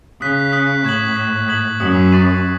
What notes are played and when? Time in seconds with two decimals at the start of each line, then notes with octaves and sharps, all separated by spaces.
0.21 C#3 D#6 F#6 B6
0.52 D#6 F#6 B6
0.84 A2 C#6 G#6 B6 F#7
1.16 C#6 G#6 B6 F#7
1.48 D#6 G#6 B6 F#7
1.80 F#2 D#6 G#6 B6 F#7
2.11 D#6 A6 D#7 F#7